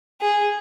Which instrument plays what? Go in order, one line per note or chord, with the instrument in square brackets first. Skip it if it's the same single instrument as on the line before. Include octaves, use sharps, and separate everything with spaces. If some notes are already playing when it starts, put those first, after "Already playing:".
[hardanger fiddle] G#4